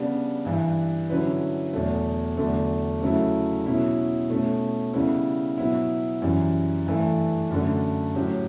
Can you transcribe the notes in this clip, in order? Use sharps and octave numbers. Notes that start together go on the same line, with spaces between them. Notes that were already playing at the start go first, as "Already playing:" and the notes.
Already playing: C#3 G3 B3 D4
G2 E3 G3
D3 F#3 C#4 E4 B4
E2 B2 F#3 A3
E2 D3 F#3 A3
C#3 F#3 A3 E4
B2 F#3 C#4 E4
B2 A3 C#4
C#3 G3 B3 E4
B2 F#3 B3 E4
F#2 E3 G3
G2 E3 A3
F#2 D3 A3
A2 F#3 C#4 G4